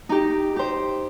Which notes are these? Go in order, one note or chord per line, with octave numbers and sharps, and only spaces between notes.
D#4 G4
G4 C5